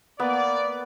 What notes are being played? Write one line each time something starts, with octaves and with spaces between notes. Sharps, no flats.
A#3 B3 D5